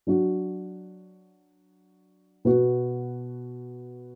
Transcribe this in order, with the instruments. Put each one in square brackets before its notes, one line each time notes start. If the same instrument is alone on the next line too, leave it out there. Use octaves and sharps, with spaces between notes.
[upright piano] F#3 D4 F#4
B2 B3 F#4